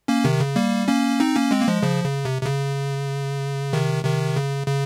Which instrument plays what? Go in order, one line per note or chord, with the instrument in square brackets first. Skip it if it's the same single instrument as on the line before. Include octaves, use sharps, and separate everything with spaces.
[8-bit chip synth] A#3 C#4
C3 D#3
C#3
G3 A#3
A#3 C#4
C4 D#4
A#3 C#4
G#3 C4
A#3
F3 G#3
C#3 F3
C#3
C3
C3
C#3
C3 D#3
C3 D#3
C#3
C#3